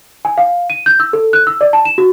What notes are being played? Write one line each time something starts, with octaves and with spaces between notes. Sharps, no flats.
G#5
F5
D#7
G6
E6
A4
F#6
E6
D5
A5
E7
F#4